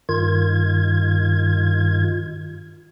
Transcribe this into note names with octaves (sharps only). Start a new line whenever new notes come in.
G2 D#3 F4 G#6